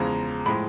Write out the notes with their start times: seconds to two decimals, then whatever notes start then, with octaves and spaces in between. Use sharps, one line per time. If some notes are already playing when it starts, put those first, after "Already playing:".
Already playing: E2 C#3 F3 G#3 A#5
0.46 A2 F3 G#3 B5